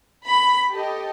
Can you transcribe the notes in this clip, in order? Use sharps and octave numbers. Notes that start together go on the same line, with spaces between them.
B5
G4 A4 D#5